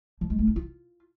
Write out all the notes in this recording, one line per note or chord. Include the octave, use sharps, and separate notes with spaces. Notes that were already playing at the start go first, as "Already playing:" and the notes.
F3
G#3
A3
D4
F4